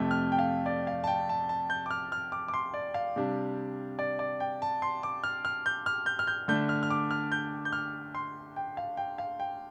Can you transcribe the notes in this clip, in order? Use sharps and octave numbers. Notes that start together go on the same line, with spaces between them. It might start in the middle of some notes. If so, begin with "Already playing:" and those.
Already playing: F2 C3 A3 G5
F6
G5
F5
D5
F5
A5
G5
A5
A5
G6
D6
F6
F6
D6
D6
C6
D5
F5
C3 G3 D4
D5
D5
G5
A5
C6
D6
F6
F6
G6
F6
G6
F6
G6
D3 A3 D4 G6
F6
F6
D6
F6
G6
G6
F6
C6
G5
F5
G5
F5
G5